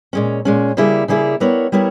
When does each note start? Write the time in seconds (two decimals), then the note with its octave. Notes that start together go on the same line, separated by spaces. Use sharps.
0.13 A#2 G#3 C#4
0.45 A#2 G#3 C#4
0.77 C#3 G3 A#3 E4 G#4
1.08 C#3 G3 A#3 E4 G#4
1.40 G3 B3 E4 A#4 C#5
1.72 G3 B3 E4 A#4 C#5